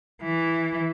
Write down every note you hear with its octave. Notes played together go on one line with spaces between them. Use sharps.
E3